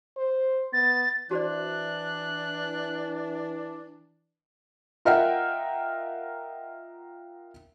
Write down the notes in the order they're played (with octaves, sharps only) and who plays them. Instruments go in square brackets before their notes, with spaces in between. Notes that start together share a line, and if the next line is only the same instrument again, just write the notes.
[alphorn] C5
[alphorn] B3 [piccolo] A6
[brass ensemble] E3 [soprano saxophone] D4 [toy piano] F#4 C5 D5 [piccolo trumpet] F#6
[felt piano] F4 A#4 D#5 E5 F#5 G5